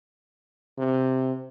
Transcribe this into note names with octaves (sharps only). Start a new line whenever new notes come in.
C3